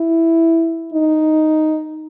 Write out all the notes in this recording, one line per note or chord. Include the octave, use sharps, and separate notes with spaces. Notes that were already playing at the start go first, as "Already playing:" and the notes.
Already playing: E4
D#4